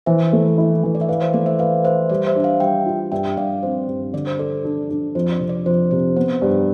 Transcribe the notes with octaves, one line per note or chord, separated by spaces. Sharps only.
E3 C5 E5
A3
E4
E3
D5
E5
B4 D5 F5
C5 E5
A3 D5
C5 E5
B4 D5 F5
B4 C5 E5
G3 D5
C5 E5
D4
D5 F5
G3 E5 G5
F4
G2 E5 G5
G2 D5 F5
C4 C5
G2
D3 D5
C5
A4 D5
D4
D4
F2 C5
D5
C3
D5
F2 C5
C3 C5
B3 C5
G2